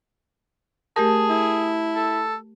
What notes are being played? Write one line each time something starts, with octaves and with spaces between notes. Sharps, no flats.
A3 G4 G#4 A#4 A5
E4
A4